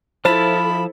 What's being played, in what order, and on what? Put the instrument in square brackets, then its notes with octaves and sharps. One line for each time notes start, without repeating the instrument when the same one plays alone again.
[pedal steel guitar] F3 F4 A5 [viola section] E4 A4 [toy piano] C5 [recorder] B5